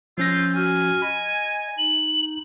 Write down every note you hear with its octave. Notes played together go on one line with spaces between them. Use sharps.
F3 C#4 F4 E6 G6 A#6
F#4 G#5 F6
D#5 B5
D#4 F#7